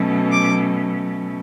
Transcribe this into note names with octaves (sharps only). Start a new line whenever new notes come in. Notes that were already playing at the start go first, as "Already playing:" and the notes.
Already playing: B2 F#3 A3 C#4
D6